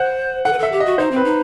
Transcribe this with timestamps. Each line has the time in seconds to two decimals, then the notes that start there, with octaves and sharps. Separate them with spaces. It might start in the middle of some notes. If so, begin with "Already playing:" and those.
Already playing: C5 F#5
0.45 A4 F#5
0.53 B4
0.59 A4 E5
0.72 G4
0.80 D#5
0.86 F#4
0.98 D#4 C5
1.11 C4 B4
1.25 D#4